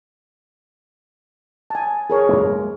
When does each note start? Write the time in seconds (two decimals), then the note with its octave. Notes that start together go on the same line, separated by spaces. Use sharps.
1.70 G#5 A5
2.10 G#4 A#4 C#5
2.29 F#2 G#3 A#3